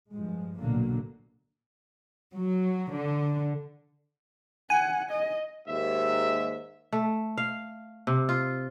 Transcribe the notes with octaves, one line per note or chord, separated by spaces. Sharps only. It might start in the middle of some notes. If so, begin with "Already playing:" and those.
G2 F3 G#3
B1 A#2 D3 F#3 A#3
F#3
D3
F#5 G#5
D#5
D#2 G#2 E5
A3
F5
C3
F4